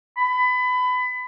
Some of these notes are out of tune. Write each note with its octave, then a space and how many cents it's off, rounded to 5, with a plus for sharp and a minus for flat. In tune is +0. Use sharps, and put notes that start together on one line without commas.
B5 +25